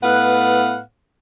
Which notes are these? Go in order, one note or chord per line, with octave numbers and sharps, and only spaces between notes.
A2 B3 B4 F5 F#5